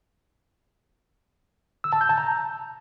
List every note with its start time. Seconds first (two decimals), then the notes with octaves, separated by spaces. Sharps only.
1.84 E6
1.93 A5
2.01 G6
2.09 A5
2.18 A#5